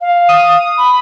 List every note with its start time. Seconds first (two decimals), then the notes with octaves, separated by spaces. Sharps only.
0.01 F5
0.29 D#6
0.78 B5